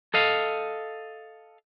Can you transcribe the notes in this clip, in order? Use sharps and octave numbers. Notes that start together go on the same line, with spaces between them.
A4 D#5 F5